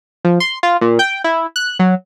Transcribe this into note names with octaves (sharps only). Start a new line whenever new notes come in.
F3
C6
F4
A#2
G5
E4
F#6
F#3